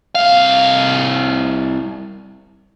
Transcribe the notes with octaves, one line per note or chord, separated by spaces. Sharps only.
C2 F5